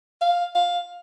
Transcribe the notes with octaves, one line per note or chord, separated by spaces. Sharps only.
F5
F5